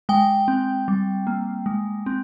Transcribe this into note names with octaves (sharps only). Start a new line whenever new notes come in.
G#3 G5
C4
G3
A#3
G#3
C4